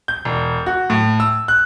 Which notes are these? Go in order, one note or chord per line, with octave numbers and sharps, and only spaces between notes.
G6
E1
F#4
A2
E6
F#6